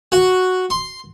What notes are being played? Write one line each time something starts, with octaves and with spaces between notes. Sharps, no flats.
F#4
C6